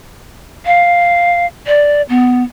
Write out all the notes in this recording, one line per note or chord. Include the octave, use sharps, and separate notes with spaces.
F5
D5
B3